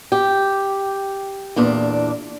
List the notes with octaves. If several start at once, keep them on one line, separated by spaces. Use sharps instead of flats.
G4
E2 A#2 D4